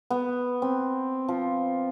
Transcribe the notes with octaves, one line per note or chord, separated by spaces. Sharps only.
B3
C4
F3